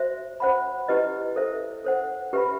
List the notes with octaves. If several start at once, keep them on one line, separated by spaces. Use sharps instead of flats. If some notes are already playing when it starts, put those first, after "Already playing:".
Already playing: F#4 C5 E5
C5 F#5 B5
E4 G4 B4 D#5
A4 C5 E5
A4 C5 F#5
G4 B4 E5 B5